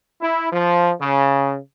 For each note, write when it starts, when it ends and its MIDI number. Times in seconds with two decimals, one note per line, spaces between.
0.21 0.50 64
0.52 0.92 53
1.01 1.57 49